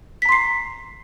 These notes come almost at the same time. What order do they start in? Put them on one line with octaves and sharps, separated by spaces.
B6 A#5 C6 C7